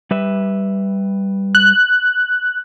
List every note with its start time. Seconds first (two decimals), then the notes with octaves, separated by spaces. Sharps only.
0.11 G3 B4 E5
1.55 F#6